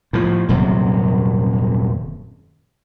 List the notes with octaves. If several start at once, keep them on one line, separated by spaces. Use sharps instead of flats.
A2 F3
D#1 F#2 C3